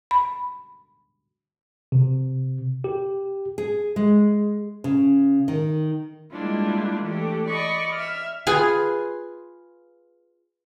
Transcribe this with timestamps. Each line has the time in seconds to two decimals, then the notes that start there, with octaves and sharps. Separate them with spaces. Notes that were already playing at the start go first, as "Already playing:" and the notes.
0.11 B5
1.92 C3
2.84 G4
3.58 G#4
3.96 G#3
4.84 C#3
5.48 D#3
6.32 G3 G#3 A#3 D4 E4 F4
7.04 E3 A3 D4 G4
7.48 D5 D#5 B5 C#6
7.94 E5 F6
8.47 F4 G#4 B4 G#5